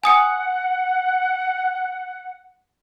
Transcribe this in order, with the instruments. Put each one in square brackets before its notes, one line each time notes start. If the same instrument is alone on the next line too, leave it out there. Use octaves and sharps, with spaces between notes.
[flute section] F#5 [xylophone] G#5 D#6 C#7